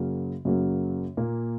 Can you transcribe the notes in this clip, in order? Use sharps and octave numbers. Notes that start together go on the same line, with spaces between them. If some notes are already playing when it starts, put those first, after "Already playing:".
Already playing: F#2 C#3 F#3 A#3
F#2 C#3 F#3 A#3
A#2 A#3